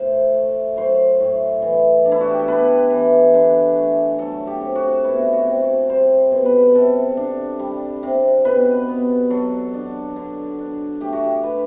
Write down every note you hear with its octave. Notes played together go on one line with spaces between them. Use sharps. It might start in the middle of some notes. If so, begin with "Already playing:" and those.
Already playing: A2 C5
A3
F#3 C5
A2
E3
D4
E4
F#4
G4
A4
B3 B4
E3
D3
A3
F#3 A4
G4
C4
F#4
B2 E4
F#4
C4
F#4
G3 C5
B2
B4
C3 A4
D4
G3
C3
B2 B4
B3
F#3 A4
D4
D3
D4
A3 G4
F#4
G4
D3 B4